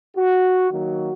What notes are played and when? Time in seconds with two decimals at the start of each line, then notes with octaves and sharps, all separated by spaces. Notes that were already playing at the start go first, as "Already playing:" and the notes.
0.16 F#4
0.70 D#3 F#3 A#3 F#4